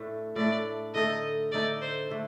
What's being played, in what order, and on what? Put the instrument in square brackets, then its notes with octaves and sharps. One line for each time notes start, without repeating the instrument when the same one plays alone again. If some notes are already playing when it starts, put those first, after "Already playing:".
Already playing: [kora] A2 A3 D4
[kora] A2 A3 D4 [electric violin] D5
[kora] D3 A3 D#4 A4 [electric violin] D#5
[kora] D3 A3 D#4 A4 [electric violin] D5
[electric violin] C5
[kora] D3 A3 D4